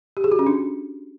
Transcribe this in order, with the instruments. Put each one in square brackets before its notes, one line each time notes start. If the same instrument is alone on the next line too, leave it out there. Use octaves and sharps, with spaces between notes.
[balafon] G4
G#4
F#4
C#4
D4